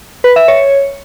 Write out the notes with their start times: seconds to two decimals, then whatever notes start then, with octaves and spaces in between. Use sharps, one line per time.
0.24 B4
0.36 E5
0.48 C#5